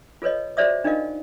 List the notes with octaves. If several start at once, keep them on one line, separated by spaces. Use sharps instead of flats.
F4 A4 B4 C#5 D#5
F#4 G#4 C5 D5 E5 D#6
D4 D#4 F4 A#4 D#5 F5